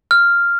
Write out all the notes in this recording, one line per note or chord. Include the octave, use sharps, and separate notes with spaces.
F6